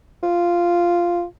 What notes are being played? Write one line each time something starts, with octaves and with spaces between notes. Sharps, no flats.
F4